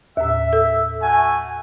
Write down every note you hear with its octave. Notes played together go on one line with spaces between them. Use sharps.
D#2 A2 E5
A4
A3 F#4 G#5